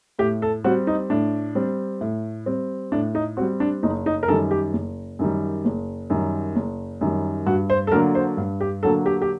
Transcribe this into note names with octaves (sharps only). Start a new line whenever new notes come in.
A2 G4
A4
G3 C4 F#4
D#4
A2 D4
G3 C4
A2
G3 C4
A2 D4
D#4
G3 C4 F#4
D4
F#1 D#4
D#4
A#4
F#2 D#3 G3 A4
G4
F#1
F#2 D#3 G3
F#1
F#2 D#3 G3
F#1
F#2 D#3 G3
G2 F#4
C5
A4
D3 F#3 A#3 D4 A#4
C5
G2
G4
D3 F#3 A#3 D4 A4
G4
G4